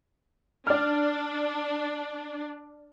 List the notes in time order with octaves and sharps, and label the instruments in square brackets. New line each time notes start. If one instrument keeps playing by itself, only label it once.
[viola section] D4 [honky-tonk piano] D5 F6